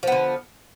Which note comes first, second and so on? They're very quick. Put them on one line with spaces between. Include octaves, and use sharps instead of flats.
F3 B3 D3